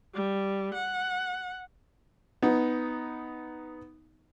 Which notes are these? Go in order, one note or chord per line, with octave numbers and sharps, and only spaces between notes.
G3
F#5
B3 D#4